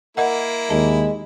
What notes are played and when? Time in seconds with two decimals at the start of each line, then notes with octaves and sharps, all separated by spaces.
0.17 A#3 E4 A#4 D#5 F#5
0.70 D#2 G#3 A5